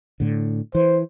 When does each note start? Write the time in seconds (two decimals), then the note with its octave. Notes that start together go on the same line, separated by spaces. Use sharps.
0.20 A2 D3
0.75 E3 C5